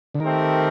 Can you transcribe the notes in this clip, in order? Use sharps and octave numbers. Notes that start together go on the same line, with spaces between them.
D3
D#3 A3 C4 G4 A#4